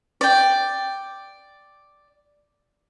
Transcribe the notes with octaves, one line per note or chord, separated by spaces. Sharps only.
D5 G5